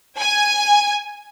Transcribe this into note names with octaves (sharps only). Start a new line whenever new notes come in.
G#5